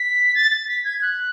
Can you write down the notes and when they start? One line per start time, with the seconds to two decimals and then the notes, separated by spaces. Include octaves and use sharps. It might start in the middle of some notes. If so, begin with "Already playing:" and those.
Already playing: B6
0.35 A6
0.51 A6
0.68 B6
0.85 G#6
1.02 F#6